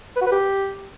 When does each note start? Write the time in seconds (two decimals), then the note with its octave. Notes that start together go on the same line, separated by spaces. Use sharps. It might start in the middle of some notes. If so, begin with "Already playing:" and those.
0.16 B4
0.21 F#4
0.27 B4
0.32 G4